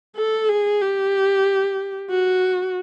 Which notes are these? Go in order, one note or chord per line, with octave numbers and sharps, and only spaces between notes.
A4
G#4
G4
F#4